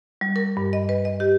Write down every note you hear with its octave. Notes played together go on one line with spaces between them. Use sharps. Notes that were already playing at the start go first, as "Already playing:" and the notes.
G3
A#4
G2
D#5
B4
D#5
G4